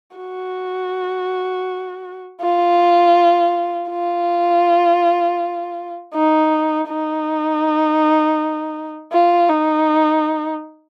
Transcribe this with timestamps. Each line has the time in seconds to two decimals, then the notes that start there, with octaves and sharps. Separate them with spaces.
0.17 F#4
2.41 F4
3.90 F4
6.14 D#4
6.89 D#4
9.12 F4
9.49 D#4